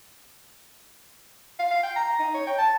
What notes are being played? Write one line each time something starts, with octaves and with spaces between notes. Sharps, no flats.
F5
F5
G5
A#5
D#4
C#5
G5
A5